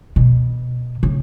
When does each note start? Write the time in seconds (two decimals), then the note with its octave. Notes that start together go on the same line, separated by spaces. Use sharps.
0.16 B2
1.03 C#3